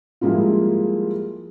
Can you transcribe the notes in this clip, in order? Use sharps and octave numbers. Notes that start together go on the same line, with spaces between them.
F3 G3 G#3 A#3 E4 F4